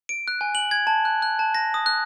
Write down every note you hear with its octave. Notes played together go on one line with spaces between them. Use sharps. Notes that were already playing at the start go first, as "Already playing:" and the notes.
D7
F#6
G#5
F#7
G#6
A5
F#6
F#6
A5
A#6
D#6
F#6